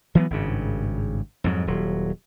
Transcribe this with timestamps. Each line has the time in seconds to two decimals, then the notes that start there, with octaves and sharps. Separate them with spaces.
0.15 E3 F#3 A#3 B3
0.30 G#1 G2 C#3
1.44 F2 G#2 F#3
1.67 D#1 F#3